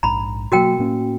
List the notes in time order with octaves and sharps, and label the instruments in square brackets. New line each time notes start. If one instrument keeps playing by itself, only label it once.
[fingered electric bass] A#1 G#2 [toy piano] A#5 B5
[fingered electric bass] B2 F#3 A#3 [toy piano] F#4 A#4 G5
[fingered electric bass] A2 A#3 C#4